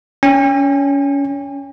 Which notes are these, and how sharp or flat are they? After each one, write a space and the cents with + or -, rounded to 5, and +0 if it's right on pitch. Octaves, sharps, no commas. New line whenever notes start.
C#4 +25 G5 +45